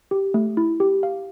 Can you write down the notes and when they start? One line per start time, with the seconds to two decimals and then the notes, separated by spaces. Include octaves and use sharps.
0.11 G4
0.34 A3
0.57 E4
0.80 G4
1.03 F5